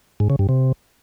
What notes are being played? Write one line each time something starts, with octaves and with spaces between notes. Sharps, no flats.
G#2
C#3
G2
C3